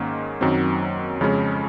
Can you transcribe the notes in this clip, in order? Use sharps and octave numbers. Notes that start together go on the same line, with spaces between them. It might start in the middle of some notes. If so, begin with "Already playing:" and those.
Already playing: G#2 D#3 A#3 C#4
F#2 D#3 F#3 C4
F2 C#3 G#3 C#4